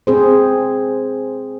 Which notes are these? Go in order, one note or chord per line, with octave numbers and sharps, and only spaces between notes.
C4 G#4 C5